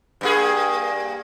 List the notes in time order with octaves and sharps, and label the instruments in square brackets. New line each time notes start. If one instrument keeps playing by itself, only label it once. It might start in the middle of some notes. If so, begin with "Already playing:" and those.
[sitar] G2 A#3 G#4